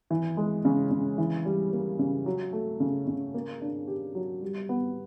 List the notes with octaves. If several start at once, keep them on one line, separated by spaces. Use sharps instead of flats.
E3
G#3
C#3
C#3
E3
G3
A#3
C#3
F#3
A3
C#3
C#3
A#3
D4
G4
F#3
G3
B3